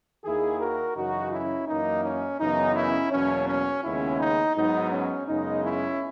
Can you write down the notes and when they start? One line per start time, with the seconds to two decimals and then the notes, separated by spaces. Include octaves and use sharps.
0.25 D#2 D#3 A#3 E4 G#4
0.60 F#4 A#4
0.96 F#2 C#3 E3 D#4 F#4
1.33 C#4 E4
1.68 F#2 E3 A#3 D#4
2.04 C#4
2.40 F#2 C#3 E3 B3 D#4
2.76 C#4 E4
3.12 E2 B2 F#3 A#3 C#4
3.48 C#4
3.83 D#2 C#3 G#3 B3 C#4 E4
4.20 D#4
4.55 G#2 F#3 B3 D#4
4.91 C#4
5.28 F#2 C#3 G#3 B3 D#4
5.63 C#4 E4